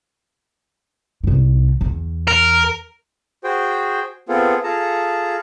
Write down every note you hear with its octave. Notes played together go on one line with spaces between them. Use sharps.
C2 G#2
E2
A#4
F#4 G#4 C5 G5
B3 C4 F4 G#4 A4
F4 G#4 A4 A5 A#5